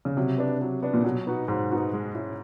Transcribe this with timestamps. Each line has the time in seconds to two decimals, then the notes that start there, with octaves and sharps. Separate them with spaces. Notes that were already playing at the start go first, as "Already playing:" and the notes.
0.05 C#3
0.17 C3 F#3
0.38 B3 D4
0.61 F#3
0.82 B3 D4
0.94 A#2
1.04 B2 F#3
1.27 B3 D#4 F#4
1.48 G#2 F#3
1.71 B3 D#4 F#4
1.93 G#3
2.15 C#4 E4